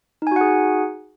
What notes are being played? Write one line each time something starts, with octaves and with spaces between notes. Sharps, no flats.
D#4 F#4 G#4 F#5 G#5